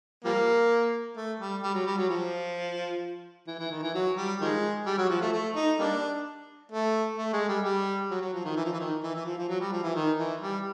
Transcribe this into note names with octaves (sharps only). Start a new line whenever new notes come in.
F3 G3 A#3
A3
G3
G3
F#3
G3
F#3
F3
E3
E3
D#3
E3
F#3
G3
D#3 F3 G#3
G3
F#3
F3
A3
A3
D#4
G3 A#3 D4
A3
A3
G#3
G3
G3
F#3
F#3
F3
D#3
E3
F3
E3
D#3
E3
E3
F3
F3
F#3
G3
F3
E3
D#3
E3
G3